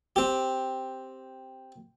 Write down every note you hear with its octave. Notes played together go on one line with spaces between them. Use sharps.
C4 G4